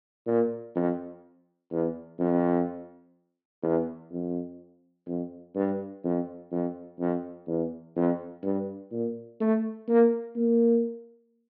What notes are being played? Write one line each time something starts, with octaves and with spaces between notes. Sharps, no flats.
A#2
F2
E2
F2
E2
F2
F2
G2
F2
F2
F2
E2
F2
G2
A#2
A3
A#3
A#3